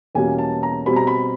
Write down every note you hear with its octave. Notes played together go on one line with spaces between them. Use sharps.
E2 B2 G3 A#3 C#4 G#5
A5
A#5
B2 G3 C4 B5
A#5
B5